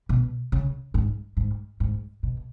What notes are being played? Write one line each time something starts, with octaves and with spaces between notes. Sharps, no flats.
B2
C#3
G#2
G#2
G#2
B2